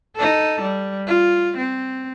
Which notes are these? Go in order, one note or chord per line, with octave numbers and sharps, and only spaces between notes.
D#4 A4
G3
F4
C4